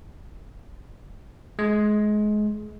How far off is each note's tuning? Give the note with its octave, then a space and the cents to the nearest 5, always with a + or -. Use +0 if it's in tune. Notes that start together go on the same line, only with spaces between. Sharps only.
G#3 +25